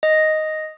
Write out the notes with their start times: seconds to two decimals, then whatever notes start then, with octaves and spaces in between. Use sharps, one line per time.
0.03 D#5